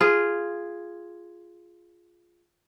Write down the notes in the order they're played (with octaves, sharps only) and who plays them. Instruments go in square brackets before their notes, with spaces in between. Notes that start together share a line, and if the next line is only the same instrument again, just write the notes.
[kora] F4 G#4